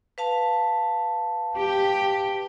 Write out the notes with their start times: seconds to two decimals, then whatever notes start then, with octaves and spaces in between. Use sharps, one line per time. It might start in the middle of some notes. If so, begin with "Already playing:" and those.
0.18 B4 F5 A5
1.58 G4